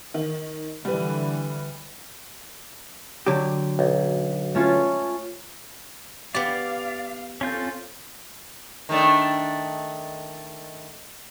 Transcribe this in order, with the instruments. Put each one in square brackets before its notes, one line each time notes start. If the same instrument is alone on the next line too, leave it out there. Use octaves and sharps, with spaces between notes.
[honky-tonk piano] D#3
[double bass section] D3 E3 [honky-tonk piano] G3 B4
[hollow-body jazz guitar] D3 F#3 G4
[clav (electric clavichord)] B1
[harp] A3 C#4 F4
[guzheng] B3 G4 [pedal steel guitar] D5 [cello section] F5
[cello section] C4 A4 [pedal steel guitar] C#4 F4 G6
[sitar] D#3 A3 D4